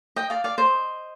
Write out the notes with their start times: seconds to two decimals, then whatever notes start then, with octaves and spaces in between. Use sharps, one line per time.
0.16 D#5 G5
0.30 D5 F5
0.44 D5 F5
0.58 C5 D#5